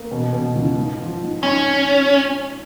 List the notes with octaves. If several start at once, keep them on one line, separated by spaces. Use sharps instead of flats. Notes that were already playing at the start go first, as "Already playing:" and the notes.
Already playing: A#3
B2
B2
C#2
G#2
F3
G#2
C#4 D#4